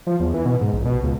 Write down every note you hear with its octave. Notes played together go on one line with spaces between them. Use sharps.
F3
E2
E3
B2
G#2
A#1
B2
C#2